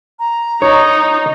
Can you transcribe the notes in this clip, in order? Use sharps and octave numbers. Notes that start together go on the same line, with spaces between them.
A#5
D#4 C#5